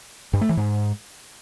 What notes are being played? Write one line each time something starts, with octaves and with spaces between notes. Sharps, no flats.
G2
A3
E3
G#2